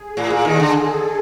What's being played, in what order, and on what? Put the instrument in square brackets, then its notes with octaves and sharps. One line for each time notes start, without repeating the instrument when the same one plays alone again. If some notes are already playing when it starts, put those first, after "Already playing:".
Already playing: [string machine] G#4
[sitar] A2
A#2
[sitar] D#2 D#3 [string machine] A4
[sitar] D3